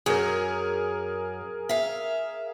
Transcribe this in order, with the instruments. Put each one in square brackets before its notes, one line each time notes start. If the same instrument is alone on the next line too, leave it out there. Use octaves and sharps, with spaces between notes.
[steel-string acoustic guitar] F#2 [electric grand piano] G#4 A#4
[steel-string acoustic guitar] E5 F5